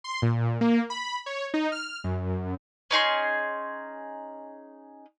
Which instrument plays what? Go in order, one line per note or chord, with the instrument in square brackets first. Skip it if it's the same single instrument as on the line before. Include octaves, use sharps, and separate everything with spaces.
[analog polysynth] C6
A#2
A#3
B5
C#5
D#4
F6
F#2
[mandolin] C#4 D#4 G#4 C6